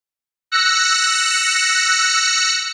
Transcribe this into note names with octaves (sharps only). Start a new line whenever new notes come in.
E6 F#6 A#6 C#7